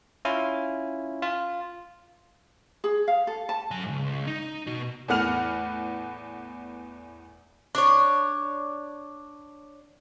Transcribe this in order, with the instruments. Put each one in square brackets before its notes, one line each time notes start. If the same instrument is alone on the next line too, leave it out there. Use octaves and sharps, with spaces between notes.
[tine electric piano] C#4 E4 F4
F4
[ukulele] G#4
F5
A4
A5
[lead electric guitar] F#3 G#5
C#2 G#2
D#4
B2 F#4
[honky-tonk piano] E2 A2 B3 F#5 F6 F7
[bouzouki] D4 C#5